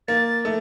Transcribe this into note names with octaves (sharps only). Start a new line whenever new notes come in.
A#3 A6
A3